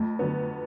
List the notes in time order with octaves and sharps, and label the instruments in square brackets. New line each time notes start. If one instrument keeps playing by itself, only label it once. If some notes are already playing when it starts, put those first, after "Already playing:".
Already playing: [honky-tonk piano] F2 [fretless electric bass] A3
[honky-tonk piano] D3 F#3 B3